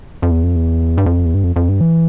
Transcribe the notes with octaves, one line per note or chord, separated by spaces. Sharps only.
F2
E2
F2
E2
G2
F2
E2
G2
F2
F2
G2
E3